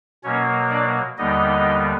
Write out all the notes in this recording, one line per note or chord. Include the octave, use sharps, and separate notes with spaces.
B2 F#3 A#3 C#4 C#5
D4 D5
D#2 D3 G3 B3 D#4 D#5